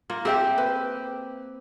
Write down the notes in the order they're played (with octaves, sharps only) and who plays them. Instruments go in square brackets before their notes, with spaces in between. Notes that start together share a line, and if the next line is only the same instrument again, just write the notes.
[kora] A#3 [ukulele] F4
[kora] C4 G4 [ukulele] G#4 E5 G5
[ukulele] B4